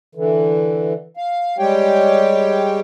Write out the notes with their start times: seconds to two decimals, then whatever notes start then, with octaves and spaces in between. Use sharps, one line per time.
0.15 D3 E3
1.17 F5
1.59 G3 G#3 G4 C#5 G5